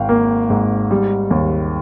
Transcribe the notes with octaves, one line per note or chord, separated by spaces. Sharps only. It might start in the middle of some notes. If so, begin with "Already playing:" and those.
Already playing: G#1 F5 G5
A#3
G#2
G3
D#2